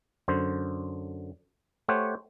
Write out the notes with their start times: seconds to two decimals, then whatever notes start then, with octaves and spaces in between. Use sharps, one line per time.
0.28 F#2 D3 C5
1.88 A3 G4 C5 C#5 F#5 G5